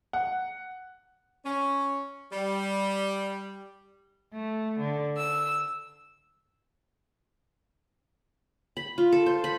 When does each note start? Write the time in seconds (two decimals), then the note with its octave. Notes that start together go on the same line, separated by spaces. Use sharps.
0.13 F#5
1.44 C#4
2.31 G3
4.32 A3
4.79 D3
5.16 E6
8.77 B5
8.98 F4
9.12 A4
9.26 C5
9.44 B5